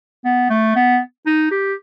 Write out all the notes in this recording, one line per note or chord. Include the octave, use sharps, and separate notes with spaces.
B3
A3
B3
D#4
G4